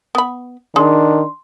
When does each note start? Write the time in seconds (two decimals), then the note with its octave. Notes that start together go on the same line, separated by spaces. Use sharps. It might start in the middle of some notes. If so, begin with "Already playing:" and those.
0.15 B3 B5
0.76 D#3 D4 G#4 C6